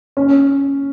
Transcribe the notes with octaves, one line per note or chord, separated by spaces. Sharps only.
C#4